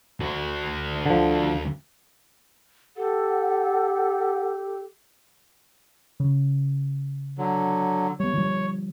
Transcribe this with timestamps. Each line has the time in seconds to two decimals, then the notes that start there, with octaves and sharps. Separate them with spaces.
0.20 D2 F#4
1.06 D3 F3
2.97 G4 A4 F#5
6.20 C#3
7.38 D3 F#3
8.20 G3 B3 C#5
8.33 D3 F3 G3